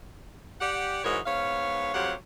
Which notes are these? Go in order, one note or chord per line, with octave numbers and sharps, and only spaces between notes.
G4 D5 F#5
G#2 E3 D#4 F#4 A#4 C#5
G#2 B3 C#5 F5
F2 C3 F#3 G4 F5 F#5